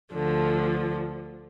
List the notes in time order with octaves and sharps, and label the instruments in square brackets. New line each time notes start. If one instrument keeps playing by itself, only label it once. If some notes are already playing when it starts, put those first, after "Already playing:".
[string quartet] D2 D3 F3